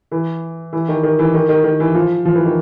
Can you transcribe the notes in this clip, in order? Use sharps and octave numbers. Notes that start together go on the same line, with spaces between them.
E3
E3
D#3
D#3
E3
D#3
D#3
D#3
E3
F3
F3
E3
D#3